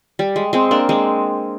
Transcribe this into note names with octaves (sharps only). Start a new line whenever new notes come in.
G3
G#3
G#3 C4
A#3 D4
G#3 C4